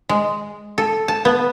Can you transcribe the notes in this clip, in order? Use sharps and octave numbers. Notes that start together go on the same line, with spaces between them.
G#3
A4
A5
B3